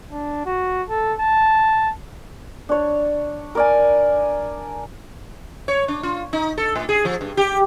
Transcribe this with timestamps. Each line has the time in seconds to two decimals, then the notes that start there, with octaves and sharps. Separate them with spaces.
0.11 D4
0.46 F#4
0.89 A4
1.20 A5
2.69 D4 C#5
3.55 A#4 D5 G#5
5.68 C#5
5.88 D4
6.03 F4
6.33 D#4
6.58 A4
6.76 A2
6.89 G#4
7.05 F3
7.21 G2
7.37 G4